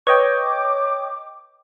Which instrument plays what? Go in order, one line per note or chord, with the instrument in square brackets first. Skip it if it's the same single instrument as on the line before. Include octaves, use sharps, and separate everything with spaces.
[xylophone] B4 [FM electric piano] C#5 D#5 G5 [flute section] D6